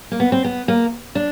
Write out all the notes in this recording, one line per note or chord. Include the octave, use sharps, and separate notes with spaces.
A#3
B3
C4
B3
A#3
D4